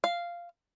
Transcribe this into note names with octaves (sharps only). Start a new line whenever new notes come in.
F5